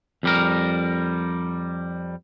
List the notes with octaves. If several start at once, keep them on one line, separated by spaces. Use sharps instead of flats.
F2 G3 A#4